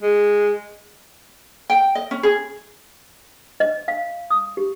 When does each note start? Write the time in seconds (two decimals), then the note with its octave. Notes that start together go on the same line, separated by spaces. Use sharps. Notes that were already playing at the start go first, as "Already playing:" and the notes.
0.01 G#3
1.70 G5
1.95 D#5
2.11 C#4
2.23 G#4
3.60 D#5
3.88 F5
4.30 D#6
4.57 G4